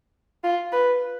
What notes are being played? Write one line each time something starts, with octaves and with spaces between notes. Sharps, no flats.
F4
B4